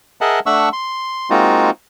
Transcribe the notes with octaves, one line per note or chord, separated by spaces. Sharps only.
G#4 A#4 D#5 E5 F#5 A5
A3 D4 E5 F#5 C#6 E6
C6
G#3 A#3 C4 D#4 F4 F#4